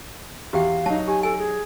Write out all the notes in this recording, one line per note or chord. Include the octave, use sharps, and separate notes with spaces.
E2 F#4 G4 F5 G5
F#3 D#4 A5
G4 G#5
A4 G#5
G#4